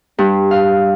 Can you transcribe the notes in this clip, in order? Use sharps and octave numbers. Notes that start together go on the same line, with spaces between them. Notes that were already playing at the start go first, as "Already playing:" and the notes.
G2
F5